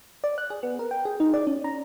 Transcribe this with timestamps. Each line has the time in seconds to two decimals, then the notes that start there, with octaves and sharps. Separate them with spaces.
0.24 D5
0.38 F#6
0.50 G#4
0.63 B3
0.79 A#4
0.91 G5
1.05 G#4
1.20 D#4
1.34 D5
1.47 C#4
1.64 A#5